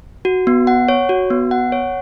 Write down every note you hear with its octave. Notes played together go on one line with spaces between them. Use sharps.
F#4
B3
F#5
C#5
F#4
B3
F#5
C#5